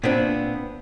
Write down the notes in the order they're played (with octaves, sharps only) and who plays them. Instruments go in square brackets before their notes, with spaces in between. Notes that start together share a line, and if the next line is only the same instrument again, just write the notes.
[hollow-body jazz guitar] A#2 B3 C4 D4